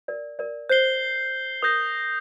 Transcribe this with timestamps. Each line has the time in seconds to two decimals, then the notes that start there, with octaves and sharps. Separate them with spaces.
0.08 A#4 D5
0.39 A#4 D5
0.69 C5 G6 C7 G7
1.62 A#4 D#6 G6 A#6